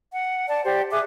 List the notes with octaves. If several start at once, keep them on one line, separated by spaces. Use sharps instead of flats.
F#5
D5 A5
G4 C5 D5
G#4 E5 D6 F#6